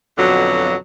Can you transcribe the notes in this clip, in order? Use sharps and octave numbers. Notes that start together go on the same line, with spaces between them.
F2 B2 D3 F#3